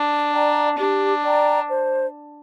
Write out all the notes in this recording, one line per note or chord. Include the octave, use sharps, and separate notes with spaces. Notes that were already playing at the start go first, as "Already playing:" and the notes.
Already playing: D4
D5 G5 A#5
D4 G4
D5 G5 A#5
C5